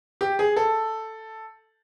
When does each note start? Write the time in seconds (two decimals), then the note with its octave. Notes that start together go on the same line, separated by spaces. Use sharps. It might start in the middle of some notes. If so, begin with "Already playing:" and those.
0.21 G4
0.39 G#4
0.56 A4